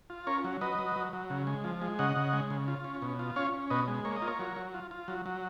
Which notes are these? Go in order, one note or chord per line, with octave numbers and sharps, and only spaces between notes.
F4
C#4 A#4 C#5
F#3
F#3 B4 D#5
F#3
F#3
F#3
C#3
G#3
F3
G#3
C#3 D#5 F#5
C#3
G#3
C#3
F4
C#4
B2
F4
C#4 C#5 F5
C#4
B2 B4 D#5
G#3
A#3 C#5
D#5
F4
A#4 C#5
F#3
F#3
F4
F4
F#3
F#3